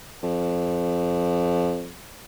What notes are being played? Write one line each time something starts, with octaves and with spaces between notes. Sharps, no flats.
F2